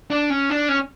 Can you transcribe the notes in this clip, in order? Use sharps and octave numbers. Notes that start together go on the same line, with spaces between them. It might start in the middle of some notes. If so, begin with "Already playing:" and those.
D4
C#4
D4
C#4